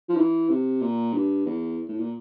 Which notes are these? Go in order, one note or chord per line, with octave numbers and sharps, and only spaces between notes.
F3
E3
C3
A#2
G2
E2
A2
A#2